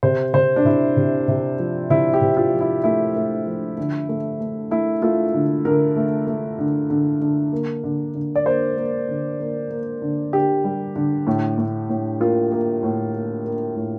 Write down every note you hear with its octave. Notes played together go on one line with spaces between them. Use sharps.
C3 C5
C3 C5
D4
C3 E4
C3
C3
F3
C3 E4
G4
C3
F4
F3
E4
A3 E4
A3
F3
D3
A3
A3
A3 E4
A3 F4
D3
D3 A#4
A3
A3
D3
D3
D3
A#3
D3
D3
D5
A#3 C5
A#3
D3
A#3
A#3
D3
D3 G4
G3
D3
A2
A2
A2
A#3 F4
A#3
A2
A#3
A#3
A2